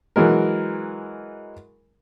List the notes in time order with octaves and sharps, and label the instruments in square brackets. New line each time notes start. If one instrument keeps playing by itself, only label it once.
[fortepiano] E3 F#3 G#3 A#4